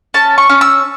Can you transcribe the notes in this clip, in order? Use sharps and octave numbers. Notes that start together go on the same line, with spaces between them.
C#4 A5
C#6
C#4
E6